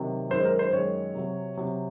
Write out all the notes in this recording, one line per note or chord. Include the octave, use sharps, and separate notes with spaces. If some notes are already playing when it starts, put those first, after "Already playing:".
Already playing: C3 D#3 F#3
F#2 D#3 G#3 C5
A#4
C5
F#2 D#3 G#3 C#5
C3 F#3
C3 F#3